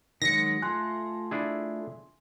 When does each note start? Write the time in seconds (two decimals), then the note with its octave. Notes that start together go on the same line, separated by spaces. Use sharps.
0.22 D#3 F#3 G#3 A#6 C#7
0.62 A3 F4 G#5 C6 F#6
1.31 D4 E4 G#4